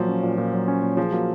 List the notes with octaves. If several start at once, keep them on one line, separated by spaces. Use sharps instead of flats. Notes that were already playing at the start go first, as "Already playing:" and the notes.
Already playing: A#2 F3 F#3
C#4
A#2
A#2
F#3
C#4
A#2
F3 G#4
F#3 A#3